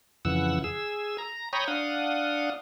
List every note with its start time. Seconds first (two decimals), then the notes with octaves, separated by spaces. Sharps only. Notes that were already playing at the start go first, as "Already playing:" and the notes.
0.25 F2 C#3 E3 F#5 E6
0.64 G#4 E6
1.18 A#5
1.53 C#5 G5 A#5 B5 C#6 D#6
1.68 D4 F5 F#5 D#6